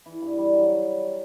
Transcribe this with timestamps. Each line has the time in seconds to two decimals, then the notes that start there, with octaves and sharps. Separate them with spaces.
0.06 E3
0.21 G2
0.38 G3
0.54 F#3